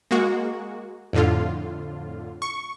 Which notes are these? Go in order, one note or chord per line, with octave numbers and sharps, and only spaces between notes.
G#3 A#3 F#4
F2 A2 D3 F4
C#6